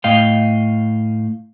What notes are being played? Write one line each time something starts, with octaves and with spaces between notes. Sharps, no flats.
A2 D#5 F5 G5